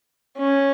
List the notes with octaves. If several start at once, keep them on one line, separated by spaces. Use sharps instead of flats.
C#4